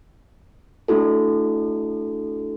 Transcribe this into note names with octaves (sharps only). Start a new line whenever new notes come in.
A3 D4 E4 F#4 A4